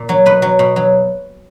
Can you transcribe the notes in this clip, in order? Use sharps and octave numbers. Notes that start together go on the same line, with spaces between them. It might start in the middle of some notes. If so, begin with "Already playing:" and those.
Already playing: A#2
F#3
B2 B4
F#3
B2
F#3